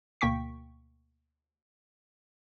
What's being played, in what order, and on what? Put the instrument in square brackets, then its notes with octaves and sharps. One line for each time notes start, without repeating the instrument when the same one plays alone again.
[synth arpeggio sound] D2 B2 A#3 G5 C#6 B6